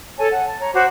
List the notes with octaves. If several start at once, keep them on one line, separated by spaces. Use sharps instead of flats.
A4 C#5 G#5 A5
F#5
A5
C#5 A#5
F#4 C5 D6